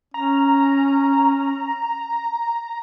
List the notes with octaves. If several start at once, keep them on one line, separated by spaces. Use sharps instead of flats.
C#4 A#5